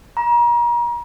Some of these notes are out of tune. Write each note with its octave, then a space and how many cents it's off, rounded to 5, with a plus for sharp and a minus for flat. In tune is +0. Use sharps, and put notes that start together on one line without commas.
A#5 +35